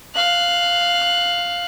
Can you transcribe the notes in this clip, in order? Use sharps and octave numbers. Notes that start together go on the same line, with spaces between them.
F5 F#6